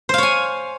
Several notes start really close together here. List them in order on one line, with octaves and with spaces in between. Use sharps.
C5 F5 C#5 G#5